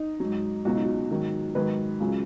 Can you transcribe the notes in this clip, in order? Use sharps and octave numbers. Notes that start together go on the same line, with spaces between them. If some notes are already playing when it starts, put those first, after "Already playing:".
Already playing: D#4
G#2 F#3
C#2 B2 F#3 F#4
D#4
F#4
G#2 D#3 F#3
G#2 D#3 F#3 B4
C#2 C#3 F#3